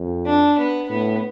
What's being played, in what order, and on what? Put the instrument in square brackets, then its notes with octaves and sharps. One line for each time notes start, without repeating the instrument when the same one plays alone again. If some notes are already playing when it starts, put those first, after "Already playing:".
Already playing: [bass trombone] F2
[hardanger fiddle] D4
B3
[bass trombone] A2 [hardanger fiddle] B3